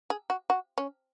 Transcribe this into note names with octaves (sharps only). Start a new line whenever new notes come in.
G#4
F#4
F#4
C#4